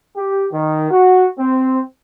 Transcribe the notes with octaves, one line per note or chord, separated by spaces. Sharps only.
G4
D#3
F#4
C4